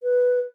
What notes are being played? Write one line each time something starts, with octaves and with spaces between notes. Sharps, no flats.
B4